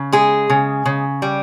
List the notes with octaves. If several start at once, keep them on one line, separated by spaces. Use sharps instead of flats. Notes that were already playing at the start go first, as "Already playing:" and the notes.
Already playing: C#3
G#3 G#4
C#3
C#3
G3